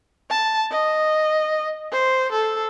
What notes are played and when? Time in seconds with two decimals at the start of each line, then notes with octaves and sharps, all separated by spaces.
0.30 A5
0.71 D#5
1.92 C5
2.32 A4